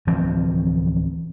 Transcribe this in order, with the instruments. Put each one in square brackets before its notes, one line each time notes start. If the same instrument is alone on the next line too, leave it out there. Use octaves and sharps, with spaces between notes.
[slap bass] D1 E3 F3 C4